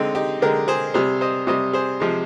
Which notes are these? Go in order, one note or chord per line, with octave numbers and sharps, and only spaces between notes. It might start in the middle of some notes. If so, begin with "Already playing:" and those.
Already playing: D3 G#3 C4 D#4
D#4 G4
D3 G#3 G4 A#4
G#4 C5
C3 G3 G#4 C5
C5 D#5
C3 G3 C5 D#5
G#4 C5
C3 F3 G#3